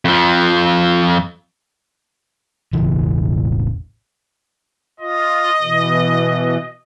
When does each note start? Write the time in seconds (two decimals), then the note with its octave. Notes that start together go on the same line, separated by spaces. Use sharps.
0.05 F2 F3
2.73 E1 A1 C#3 E3
5.00 F4 D#5
5.61 B2 E3